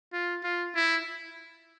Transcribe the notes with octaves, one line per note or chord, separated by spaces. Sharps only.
F4
F4
E4